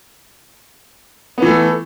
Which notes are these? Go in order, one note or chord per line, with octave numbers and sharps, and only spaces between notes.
E3 A3 B3